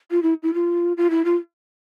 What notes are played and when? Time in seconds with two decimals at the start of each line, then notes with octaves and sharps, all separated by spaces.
0.11 F4
0.23 E4
0.43 E4
0.54 F4
0.97 F4
1.10 E4
1.25 F4